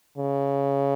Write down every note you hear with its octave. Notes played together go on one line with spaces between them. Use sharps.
C#3